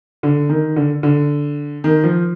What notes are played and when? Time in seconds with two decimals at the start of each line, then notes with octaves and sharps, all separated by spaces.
0.23 D3
0.49 D#3
0.76 D3
1.03 D3
1.84 D#3
2.04 F3